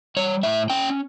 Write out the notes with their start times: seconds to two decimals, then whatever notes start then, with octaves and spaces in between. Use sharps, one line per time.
0.17 G3 C#5
0.43 A2 E5
0.70 C#4 G5